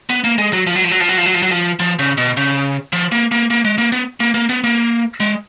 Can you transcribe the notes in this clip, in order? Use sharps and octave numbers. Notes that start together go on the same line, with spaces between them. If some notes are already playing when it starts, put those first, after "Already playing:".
B3
A#3
G#3
F#3
F3
F#3
F3
F#3
F3
F#3
F3
F#3
F3
F#3
F3
F3
C#3
B2
C#3
F3
A#3
A#3
A#3
G#3
A#3
B3
A#3
A#3
B3
A#3
G#3